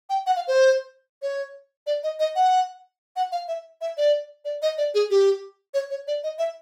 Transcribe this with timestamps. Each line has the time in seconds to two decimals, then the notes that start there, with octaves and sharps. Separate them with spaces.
0.10 G5
0.26 F#5
0.36 F5
0.47 C5
1.22 C#5
1.87 D5
2.03 D#5
2.20 D#5
2.35 F#5
3.16 F#5
3.32 F5
3.48 E5
3.81 E5
3.97 D5
4.45 D5
4.62 D#5
4.78 D5
4.94 G#4
5.10 G4
5.74 C#5
5.90 C#5
6.07 D5
6.24 D#5
6.38 E5